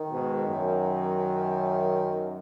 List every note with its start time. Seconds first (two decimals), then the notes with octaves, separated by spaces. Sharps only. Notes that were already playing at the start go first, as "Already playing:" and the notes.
Already playing: D#3
0.11 G#2 B2
0.47 F#2